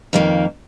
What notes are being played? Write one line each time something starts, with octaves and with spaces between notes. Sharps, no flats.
F2 D#3 A#3